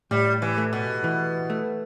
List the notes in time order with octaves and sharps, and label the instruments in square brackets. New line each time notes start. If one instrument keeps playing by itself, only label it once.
[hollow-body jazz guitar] A2 [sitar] G3
[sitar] E3
[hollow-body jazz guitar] A3
[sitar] B2
[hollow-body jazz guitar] E3
A3